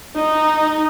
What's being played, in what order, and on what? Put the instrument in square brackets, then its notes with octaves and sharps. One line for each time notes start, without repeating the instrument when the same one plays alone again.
[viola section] D#4